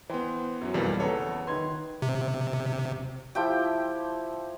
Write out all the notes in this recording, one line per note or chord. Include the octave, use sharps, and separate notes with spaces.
E3 B3 C5 G5 C6
F#2 F#3
B1 F2 E3 G3 A#3 B4
F#1 E2 A4 B4 C#5 A#5
D#3 D#4 B4 C6 G#6
C3
F3 E4 G4 G5